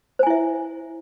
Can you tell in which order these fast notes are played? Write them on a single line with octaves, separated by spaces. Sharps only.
C5 G#5 E4 E5